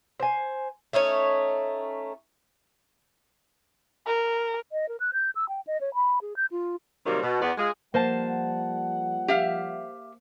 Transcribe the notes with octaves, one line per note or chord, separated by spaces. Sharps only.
C5 G#5
A3 C#4 D#4 C#5
A#4
D#5
A#4
F#6
G6
E6
G5
D#5
C#5
B5
G#4
G6
F4
C3 D#3 F#3 G3 A#3 C4
B2
E2 B3 D5
G#3 F4 G#4
F3 G3 A#3 C5 F#5 A5
G4 E5 F5